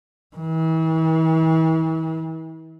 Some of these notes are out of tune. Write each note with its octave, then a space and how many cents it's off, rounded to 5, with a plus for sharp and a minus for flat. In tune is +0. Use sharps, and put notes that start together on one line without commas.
E3 -40